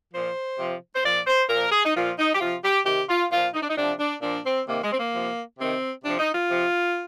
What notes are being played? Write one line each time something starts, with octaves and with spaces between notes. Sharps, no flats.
A#2 F3 C5
C3 F3
C5
A#2 F3 D5
C5
A#2 F3 A#4
G#4
D#4
A#2 F3 F4
D#4
G4
C3 F3 F4
G4
C3 D#3 G4
F4
A#2 F3 F4
D#4
D4
D#4
C3 F3 D4
D4
A#2 F3 D4
C4
C3 D#3 A#3
G#3
C4
A#3
C3 F3
C3 D#3 C4
C3 F3 D4
D#4
F4
C3 F3